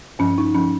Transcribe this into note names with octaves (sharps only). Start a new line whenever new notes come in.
G2 F3 C#4
D#4
F3 C#4